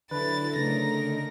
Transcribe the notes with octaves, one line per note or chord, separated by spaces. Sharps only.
D3 F#3 E4 B4 A6
C#3 A3 C#4 D#4 A#4 A#6